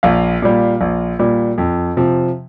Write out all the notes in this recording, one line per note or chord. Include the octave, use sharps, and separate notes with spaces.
A#1 F5
A#2 G3
A#1
A#2 G3
F2
C3 F3